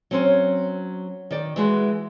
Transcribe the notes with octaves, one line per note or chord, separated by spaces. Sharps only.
F#3 C4 C#4
D#3 D5
E3 G#3 F#4